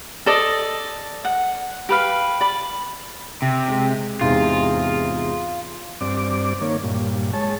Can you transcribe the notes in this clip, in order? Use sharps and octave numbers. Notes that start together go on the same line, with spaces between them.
A4 D5 D#5
F#5
G4 B4 F5
D5 B5
C3
G#3
E2 G#2 C3 F4
G2 C4 D5 D6
D#3 A#3 C#5
G2 A#2
G#3 C#5 A5